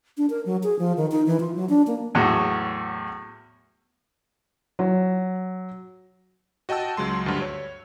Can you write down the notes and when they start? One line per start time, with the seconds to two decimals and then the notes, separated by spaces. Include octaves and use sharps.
0.17 D4
0.30 A#4
0.45 F#3
0.63 G#4
0.79 F3
0.97 D#3
1.11 D#4
1.26 E3
1.40 F4
1.55 F#3
1.69 D4
1.87 A#3
2.15 E2 A2 F#3
4.79 F#3
6.69 F#4 D#5 G5 A5 E6
6.97 C#2 F#3 G#3 C6
7.26 D2 G2
7.42 C#5